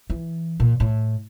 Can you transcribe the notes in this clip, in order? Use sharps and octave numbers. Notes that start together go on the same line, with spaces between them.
E3
A#2
A2